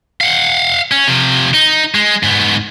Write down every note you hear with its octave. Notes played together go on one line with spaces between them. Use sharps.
F5 F#5
C#4
C3 F3
D#4
G#3
G#2 B3